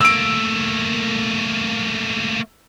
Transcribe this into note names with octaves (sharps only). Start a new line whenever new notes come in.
A3 A#3 E6 D7